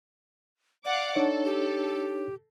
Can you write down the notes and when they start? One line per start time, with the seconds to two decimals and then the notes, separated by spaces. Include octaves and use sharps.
0.85 D5 F5 F#5 D6
1.16 D4 D#4 A4 C#5
1.45 G4